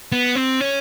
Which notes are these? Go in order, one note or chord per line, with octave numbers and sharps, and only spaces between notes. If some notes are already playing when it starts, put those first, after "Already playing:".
B3
C4
C#4